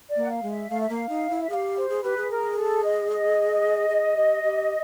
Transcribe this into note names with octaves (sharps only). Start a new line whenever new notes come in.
D5
A#3
F#5
F5
G#3
E5
A3 F5
E5
A#3 F5
D#4
E4
E5
G4 G#4 F5
C5
G#4
G4 B4
G#4
A#4
A4
D#5
D#5
G#4
G4
G4